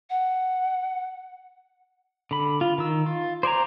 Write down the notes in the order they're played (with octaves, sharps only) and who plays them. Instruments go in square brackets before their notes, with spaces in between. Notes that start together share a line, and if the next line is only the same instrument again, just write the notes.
[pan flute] F#5
[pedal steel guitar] D3 B5
F4
D#3 E6
F4
C5 D5 G#5 A#5